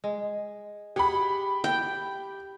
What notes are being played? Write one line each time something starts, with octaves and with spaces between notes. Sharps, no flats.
G#3
G4 G#4 F#5 B5
G5